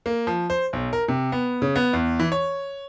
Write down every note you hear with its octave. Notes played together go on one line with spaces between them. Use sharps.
A#3
F3
C5
B1
A#4
C3
B3
C#3
B3
E2
E3
C#5